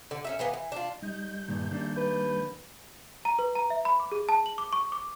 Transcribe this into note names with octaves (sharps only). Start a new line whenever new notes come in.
D3
C#4 D#4 E5
E3 A#3 B3
E3
D4 F4
G3 D#4 G6
G2 A#2 D#3
D#3 A#3 D4
B4
A#5
B4
A#5
E5
B5
D6
G#4
A5
F#7
D6
C#6
D6